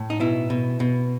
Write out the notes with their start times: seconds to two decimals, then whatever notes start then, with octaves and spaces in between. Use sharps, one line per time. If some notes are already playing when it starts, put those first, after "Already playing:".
Already playing: A2
0.10 D#4
0.20 B2 E4
0.50 B2
0.80 B2